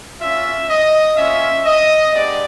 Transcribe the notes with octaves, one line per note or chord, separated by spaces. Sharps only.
A#3 C#4 F4 E5
D#5
A#3 C#4 F4 E5
D#5
G#3 B3 D4 G4 D5